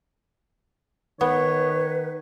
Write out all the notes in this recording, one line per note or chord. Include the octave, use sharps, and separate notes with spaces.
D#3 B3 B4 C#5